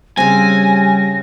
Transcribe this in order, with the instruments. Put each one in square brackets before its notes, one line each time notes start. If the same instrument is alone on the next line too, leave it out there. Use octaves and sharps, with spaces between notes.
[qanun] C#3 C4 [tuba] G3 [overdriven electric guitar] G#5 [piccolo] A#6